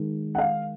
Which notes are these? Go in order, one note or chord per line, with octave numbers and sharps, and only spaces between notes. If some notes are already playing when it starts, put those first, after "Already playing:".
Already playing: D#3 G#3
F#5
F5